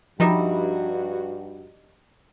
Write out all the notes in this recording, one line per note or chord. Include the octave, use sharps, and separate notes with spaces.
G2 F3 G3 D#4 E4 F#4